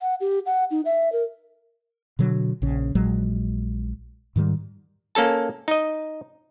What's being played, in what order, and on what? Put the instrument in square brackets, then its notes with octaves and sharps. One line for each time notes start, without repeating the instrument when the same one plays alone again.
[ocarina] F#5
G4
F#5
D#4
E5
A#4
[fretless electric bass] B2 D3 F#3
A#1 C#3
A#1 A#2 F#3 G#3
G#2 D#3 E3 G3
[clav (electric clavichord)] A#3 C#4 A4 A5
D#4 D#5